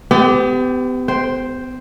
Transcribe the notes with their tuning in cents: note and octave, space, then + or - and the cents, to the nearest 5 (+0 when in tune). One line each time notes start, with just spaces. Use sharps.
B3 +40 G4 +0
C5 +0 G5 +0